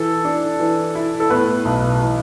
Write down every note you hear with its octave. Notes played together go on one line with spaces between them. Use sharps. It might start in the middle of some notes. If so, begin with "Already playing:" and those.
Already playing: E3 A4
D4
E3
E4
A4
A2 B3 B4
B1
E3